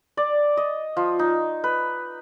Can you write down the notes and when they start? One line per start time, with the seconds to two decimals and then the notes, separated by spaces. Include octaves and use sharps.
0.17 D5
0.57 D#5
0.97 F3
1.19 D#4
1.64 B4